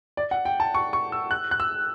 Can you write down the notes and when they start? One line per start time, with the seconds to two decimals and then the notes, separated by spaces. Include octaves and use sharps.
0.17 D5
0.31 F#5
0.45 G5
0.60 A5
0.74 C#6
0.93 C#6
1.12 E6
1.31 F#6
1.51 F#6
1.60 E6